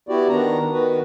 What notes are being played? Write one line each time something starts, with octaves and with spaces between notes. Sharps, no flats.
B3 E4 F#4 G4 D5
D#3 B3 D4 A#5
D#3 B3 F#4 B4